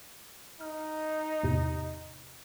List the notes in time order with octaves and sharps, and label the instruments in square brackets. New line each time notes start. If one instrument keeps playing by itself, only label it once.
[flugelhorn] D#4 [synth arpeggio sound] F6
[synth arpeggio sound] E2 A2 C3